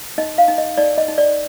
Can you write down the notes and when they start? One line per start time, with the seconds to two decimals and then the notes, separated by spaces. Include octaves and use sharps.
0.18 D#4 D#5
0.38 F5
0.48 D#4
0.58 D#5
0.77 D#4 D5
0.98 D#5
1.08 D#4
1.18 D5